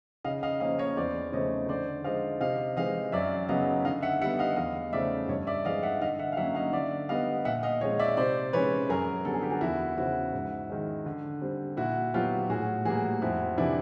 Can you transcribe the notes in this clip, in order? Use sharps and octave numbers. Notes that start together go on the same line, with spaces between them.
C#3 D#5 F5
D#5 F5
F3 A#3 C#4 D#5 F5
C#5 D#5
E2 C5 D5
C#3 F3 A3 C4 C#5 D#5
D3 C5 D5
F3 G#3 D#5 F5
C3 D#5 F5
E3 G#3 C4 D#5 F5
F#2 D5 E5
C#3 F#3 B3 D#5 F5
D3 D#5 F5
E5 F#5
G3 B3 E5 F#5
D#5 F5
E2 D#5 F5
C#3 F3 A3 D5 E5
G2 C#5 D#5
D5 E5
E3 G#3 C4 D#5 F5
E5 F#5
D3 D#5 F5
E5 F#5
F5
F#3 A#3 C#4 E5 F#5
D#5 F5
D3 D5 E5
G3 B3 D#5 F5
A#2 E5 F#5
D#5 F5
F3 G#3 C4 C#5 D#5
D5 E5
C3 C5 D5
E3 G#3 C#4 B4 C#5
F#2 G#4 A#4
D3 G3 B3 A4
G#4
G4
F#4 G#4
E2 E4 F#4
C#3 F3 E4 F#4
G#2
D#3 G#3
D3
G3 C4
A#2 E4 F#4
F#3 B3 F4 G4
A2 F#4 G#4
E3 G3 A#3 F#4 G#4
F2 E4 F#4
C3 E3 D4 E4